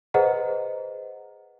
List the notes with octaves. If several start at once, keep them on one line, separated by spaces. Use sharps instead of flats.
G#4 B4 C5 D#5 F#5 A#5